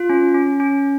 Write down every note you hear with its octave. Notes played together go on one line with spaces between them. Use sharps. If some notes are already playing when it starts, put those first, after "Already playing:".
Already playing: F4
C#4
C#4
C#4